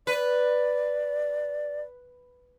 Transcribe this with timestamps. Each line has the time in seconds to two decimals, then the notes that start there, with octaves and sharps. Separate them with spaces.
0.07 B4 D5